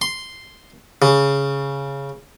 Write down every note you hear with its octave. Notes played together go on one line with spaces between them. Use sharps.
C6
C#3